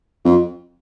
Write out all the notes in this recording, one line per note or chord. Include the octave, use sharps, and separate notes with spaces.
F2